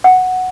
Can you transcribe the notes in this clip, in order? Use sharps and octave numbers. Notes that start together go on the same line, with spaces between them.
F#5